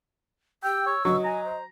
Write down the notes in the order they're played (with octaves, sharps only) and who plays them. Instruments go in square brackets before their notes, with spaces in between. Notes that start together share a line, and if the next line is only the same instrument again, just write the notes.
[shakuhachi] G4 [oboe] G5 [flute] E6
[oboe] C#5
[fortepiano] F#3 [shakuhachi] D#5 [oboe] C#6
[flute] G#5 [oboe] A#5
[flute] C5